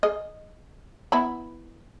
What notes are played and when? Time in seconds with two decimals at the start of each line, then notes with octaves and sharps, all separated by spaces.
0.03 G#4 D#5
1.12 B3 E4 B5